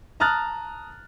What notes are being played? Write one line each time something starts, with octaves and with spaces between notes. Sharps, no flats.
A5 A#5 D#6 F6 F#6 A6